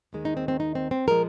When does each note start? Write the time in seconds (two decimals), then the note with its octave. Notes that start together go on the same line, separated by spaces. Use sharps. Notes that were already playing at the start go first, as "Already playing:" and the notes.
0.13 D#2 D#3 G#3
0.25 D#4
0.37 C4
0.48 C4
0.60 D#4
0.75 C4
0.91 C4
1.07 A#2 F3 G#3 A#4